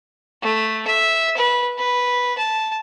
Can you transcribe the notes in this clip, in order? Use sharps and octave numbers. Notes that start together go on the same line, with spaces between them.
A3
E5
B4
B4
A5